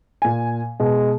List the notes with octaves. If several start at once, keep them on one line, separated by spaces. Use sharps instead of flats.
A#2 G#5
B2 G#3